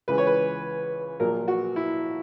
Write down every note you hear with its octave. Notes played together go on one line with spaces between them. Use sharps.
C#2 C#3 E3 B4
C#5
B4
A#1 A#2 F#3 A#4
F#4
E4